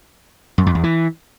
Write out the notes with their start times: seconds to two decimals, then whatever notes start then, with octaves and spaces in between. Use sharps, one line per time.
0.58 F#2
0.66 F2
0.75 E2
0.83 E3